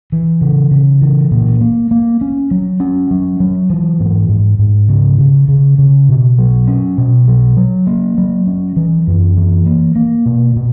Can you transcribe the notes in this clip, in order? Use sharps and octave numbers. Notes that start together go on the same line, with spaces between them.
E3
C#3
C#3
E3
A#2
A#3
A#3
C#4
F#3
C#4
F#3
F#3
E3
G#2
G#2
G#2
C#3
C#3
C#3
C#3
B2
F#3
C#4
B2
F#3
F#3
A#3
F#3
C#4
E3
F#2
E3
A#3
A#3
B2
B2